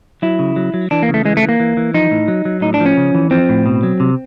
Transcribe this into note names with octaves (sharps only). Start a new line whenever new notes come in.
F#3 E4
C#3
F#3
F#3
E3 D4
A#3
C#3
A3
E3 G#3
A3
E3
A#3
E3
E3
F3 D#4
A2
F#3
F#3
A2 D#4
D4
F3
C#4
C#3
E3
F3 C4
A2
B2
F#3
C3